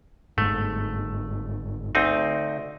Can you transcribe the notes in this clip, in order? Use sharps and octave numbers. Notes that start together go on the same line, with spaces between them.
G1 G#2 A3
D2 C4 D#4